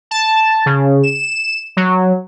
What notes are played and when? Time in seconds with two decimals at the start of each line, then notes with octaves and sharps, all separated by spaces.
0.11 A5
0.66 C#3
1.03 E7
1.77 F#3